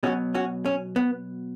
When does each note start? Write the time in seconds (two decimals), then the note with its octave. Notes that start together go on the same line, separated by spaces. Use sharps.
0.03 B2 F#3 C#4 F#4
0.34 C#4 F#4
0.66 C#4
0.96 B3